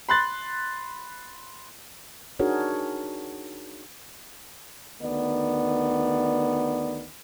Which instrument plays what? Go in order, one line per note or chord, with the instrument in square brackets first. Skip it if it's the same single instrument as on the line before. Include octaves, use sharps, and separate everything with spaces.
[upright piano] B5 C6 F#6 A6
[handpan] D4 D#4 F#4 G#4 A#4 C#5
[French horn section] D2 D#3 B3 D5